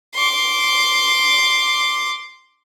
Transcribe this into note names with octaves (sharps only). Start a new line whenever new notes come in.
C6 D6